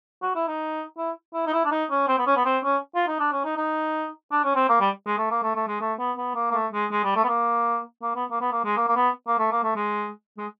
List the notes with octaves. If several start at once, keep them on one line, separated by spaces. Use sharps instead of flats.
F#4
E4
D#4
E4
E4
D#4
E4
D4
D#4
C#4
C4
B3
C#4
B3
C4
C#4
F4
D#4
D4
C#4
D#4
D#4
D4
C#4
C4
A#3
G3
G#3
A3
A#3
A3
A3
G#3
A3
B3
B3
A#3
A#3
A3
G#3
G#3
G3
A3
B3
A#3
A#3
B3
A#3
B3
A#3
G#3
A#3
A#3
B3
A#3
A3
A#3
A3
G#3
G#3